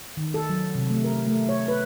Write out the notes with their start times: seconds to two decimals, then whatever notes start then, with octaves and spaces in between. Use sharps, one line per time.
0.17 D#3
0.34 A4
0.49 F#3
0.75 C3
0.90 A3
1.04 A#4
1.28 A3
1.49 C#5
1.68 B4